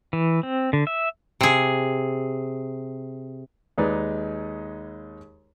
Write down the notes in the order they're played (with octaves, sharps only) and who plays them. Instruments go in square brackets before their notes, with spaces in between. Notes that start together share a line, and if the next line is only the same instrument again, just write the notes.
[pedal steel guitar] E3
C4
D3
E5
[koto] C3 G#4
[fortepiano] D#2 G#3 D#4 B4 D5